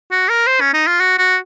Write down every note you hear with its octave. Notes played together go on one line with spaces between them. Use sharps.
F#4
A#4
C5
C#4
D#4
F4
F#4
F#4